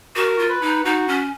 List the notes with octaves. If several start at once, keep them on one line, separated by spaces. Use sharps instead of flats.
F#4 A#4
F4
B4
D#4
D#4 F#4
C#4